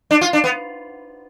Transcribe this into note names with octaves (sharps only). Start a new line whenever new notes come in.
D4
F4
D4
B3